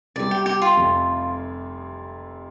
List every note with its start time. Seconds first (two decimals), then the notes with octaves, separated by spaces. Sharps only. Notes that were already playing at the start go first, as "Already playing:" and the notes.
0.16 C2 C3 G3 D5
0.31 G4
0.46 G4
0.62 F4
0.77 F1 F2 C3